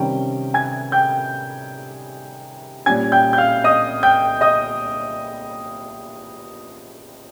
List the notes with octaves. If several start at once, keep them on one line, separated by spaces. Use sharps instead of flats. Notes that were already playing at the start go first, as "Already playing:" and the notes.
Already playing: C3 D#3 G3 C#4 G5
G#5 G#6
G5 G6
A#2 G3 C#4 G#5 G#6
G5 G6
G6
F5 F6
D#5 D#6
G5 G6
D#5 D#6